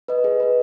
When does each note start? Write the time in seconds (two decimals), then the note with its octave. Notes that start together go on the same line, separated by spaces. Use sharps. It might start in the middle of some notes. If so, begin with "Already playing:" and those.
0.08 B4 D#5
0.24 G#4
0.40 B4 D#5